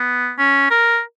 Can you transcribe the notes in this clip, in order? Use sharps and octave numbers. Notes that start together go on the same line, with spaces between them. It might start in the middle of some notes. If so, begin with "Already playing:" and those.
Already playing: B3
C#4
A#4